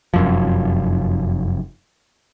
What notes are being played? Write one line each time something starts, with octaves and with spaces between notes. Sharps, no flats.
F1 F#2 F3